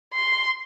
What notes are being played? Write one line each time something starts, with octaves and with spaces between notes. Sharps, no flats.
C6